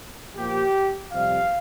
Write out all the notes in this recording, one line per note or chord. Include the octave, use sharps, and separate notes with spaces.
A#2 F3 A#3 G4
F2 C3 G3 F5